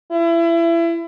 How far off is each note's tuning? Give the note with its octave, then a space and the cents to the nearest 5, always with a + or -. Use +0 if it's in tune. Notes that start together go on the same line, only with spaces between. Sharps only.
E4 +30